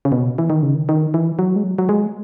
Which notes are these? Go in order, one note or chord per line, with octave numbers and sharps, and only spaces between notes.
C#3
B2
E3
D#3
C#3
D#3
D#3
E3
F#3
G#3
F#3
F#3
G#3